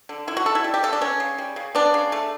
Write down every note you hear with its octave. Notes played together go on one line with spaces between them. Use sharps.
D3
D3 E4
F#4
A3 A4
E4
G3
G4
C#3 A4
D4
B3 C#4
C#3
G3
C#3
B3 D4
C#3
A3